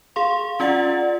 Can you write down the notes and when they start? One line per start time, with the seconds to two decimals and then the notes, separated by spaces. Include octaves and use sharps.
0.16 G#4 F5 C6
0.60 C#4 F4 D5 F#5